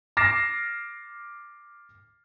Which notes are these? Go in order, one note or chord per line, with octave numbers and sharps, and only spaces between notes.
D6 F6 A6 A#6 C7 E7